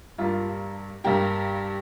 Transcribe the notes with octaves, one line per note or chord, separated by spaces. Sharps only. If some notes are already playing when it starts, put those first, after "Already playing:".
G2 G3 A#3 F4
G2 G3 A#3 G4